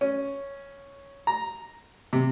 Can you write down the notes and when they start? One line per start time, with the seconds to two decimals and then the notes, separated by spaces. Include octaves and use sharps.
0.01 C#4
1.27 A#5
2.13 C3